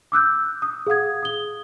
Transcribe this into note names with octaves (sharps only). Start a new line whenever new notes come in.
D6 E6 F#6 G6
D#6
G#4 F5 F#5 D#6 G#6
D#6 G7